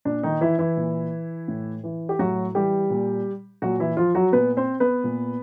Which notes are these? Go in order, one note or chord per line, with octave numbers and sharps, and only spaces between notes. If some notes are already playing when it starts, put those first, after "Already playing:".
A#2 D4
D#3 D#4
E3 E4
E3 E4
A#2
A2
E3
G4
A2 F#3 F#4
E3 G3 G4
A#2
A#2 F#3 F#4
E3 E4
F3 F4
F#3 F#4
A#2 B3 B4
C4 C5
B3 B4
A#2